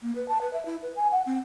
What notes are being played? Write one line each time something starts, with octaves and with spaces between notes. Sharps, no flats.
A#3
B4
A5
B4
E5
E4
B4
G#5
F#5
C4